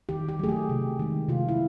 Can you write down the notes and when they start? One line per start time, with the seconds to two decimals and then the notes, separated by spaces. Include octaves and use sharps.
0.09 D#3 G4
0.29 G4
0.39 F#3 A3 G#4
0.49 G4
0.69 C3
0.99 D#3 G#3
1.29 C3 F4
1.48 E4